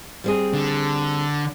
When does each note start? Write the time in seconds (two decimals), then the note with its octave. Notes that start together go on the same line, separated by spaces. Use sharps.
0.24 G3 C4 G#4
0.54 D3